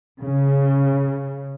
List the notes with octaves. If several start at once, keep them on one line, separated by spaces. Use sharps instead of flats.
C#3